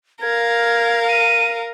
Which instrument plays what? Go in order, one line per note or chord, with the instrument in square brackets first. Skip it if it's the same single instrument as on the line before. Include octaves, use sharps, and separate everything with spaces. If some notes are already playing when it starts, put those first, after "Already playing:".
[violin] A#4 F5 [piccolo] G#6
[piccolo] D#7